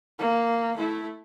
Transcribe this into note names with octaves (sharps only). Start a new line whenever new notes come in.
A#3
A3 E4